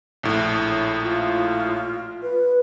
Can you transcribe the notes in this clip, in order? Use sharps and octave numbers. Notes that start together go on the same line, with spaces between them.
A#1 A2
F4
B4